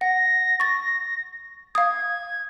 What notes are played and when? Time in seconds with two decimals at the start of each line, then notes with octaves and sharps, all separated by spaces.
0.01 F#5 A#6
0.60 C#6 A6
1.75 F5 D#6 G#6